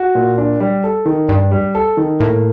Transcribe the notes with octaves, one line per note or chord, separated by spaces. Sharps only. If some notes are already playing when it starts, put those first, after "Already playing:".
Already playing: F#4
A#2
D4
G3
A4
D#3
G2 D4
G3
A4
D#3
A2 A#3